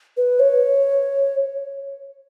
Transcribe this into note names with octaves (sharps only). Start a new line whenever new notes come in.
B4
C#5